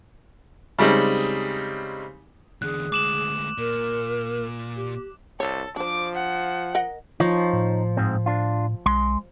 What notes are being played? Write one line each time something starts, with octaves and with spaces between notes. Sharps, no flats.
C#3 G3 G#3 C4 D#4
E2 D3 G#4 F#6
D2 G#3 D6 E7 F#7
A#2 A#4
G4
C2 A4 C#5
F3 D4 C5 D6
F#5
A#4 D#5 F#5
F3 D#4 C#5
A2
G#2 G#3 C4
D4 F4
B1 G#3 C6